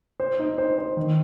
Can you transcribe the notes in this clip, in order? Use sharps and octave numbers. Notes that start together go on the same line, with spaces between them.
C5
D#4
C5
C5
D#3